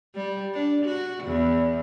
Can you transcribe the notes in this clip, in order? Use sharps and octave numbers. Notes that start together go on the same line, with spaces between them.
G3
D4
F#4
E2